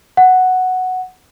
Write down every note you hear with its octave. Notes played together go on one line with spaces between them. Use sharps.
F#5